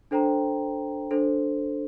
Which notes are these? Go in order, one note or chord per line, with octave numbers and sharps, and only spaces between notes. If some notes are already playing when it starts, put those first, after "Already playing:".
D4 A4 C5 G5 A#5
D4 A4 C5